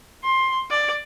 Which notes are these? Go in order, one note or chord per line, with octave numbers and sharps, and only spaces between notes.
C6
D5